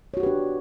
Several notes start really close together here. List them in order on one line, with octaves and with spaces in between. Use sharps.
C#5 F#4 G4 B4 D4